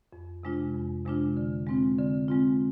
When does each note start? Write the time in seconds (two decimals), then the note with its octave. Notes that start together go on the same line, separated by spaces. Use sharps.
0.13 F2
0.43 C3 G#3 D4 F4
0.74 F2
1.05 C3 G#3 D4 F4
1.37 D3
1.67 G#3 C4 F4
1.98 D3
2.28 G#3 C4 F4